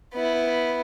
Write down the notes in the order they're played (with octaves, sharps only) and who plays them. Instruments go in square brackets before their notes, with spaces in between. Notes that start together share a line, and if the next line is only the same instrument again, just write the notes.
[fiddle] B3 E4